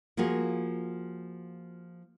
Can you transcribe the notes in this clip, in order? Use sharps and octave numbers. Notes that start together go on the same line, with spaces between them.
F3 A#3 F4 F#4 G#4